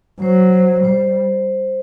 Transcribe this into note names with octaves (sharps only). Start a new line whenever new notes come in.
F#3 C5
C5
G3 C5